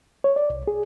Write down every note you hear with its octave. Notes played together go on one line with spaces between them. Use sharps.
C#5
D5
C2
G#4